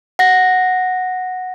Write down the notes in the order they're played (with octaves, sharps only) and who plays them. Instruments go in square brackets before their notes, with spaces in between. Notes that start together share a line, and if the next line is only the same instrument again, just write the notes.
[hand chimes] F#5 A#6